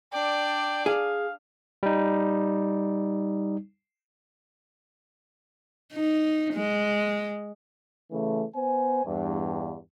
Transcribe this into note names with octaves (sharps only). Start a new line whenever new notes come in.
D4 D5 G5
G#4 F5
G3 D#4
D#4
G#3
C#3 E3 A3
B3 C5 G#5
E2 G2